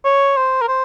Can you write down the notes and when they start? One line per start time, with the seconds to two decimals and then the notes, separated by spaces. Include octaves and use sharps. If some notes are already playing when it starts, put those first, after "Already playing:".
0.05 C#5
0.37 C5
0.61 A#4
0.68 C5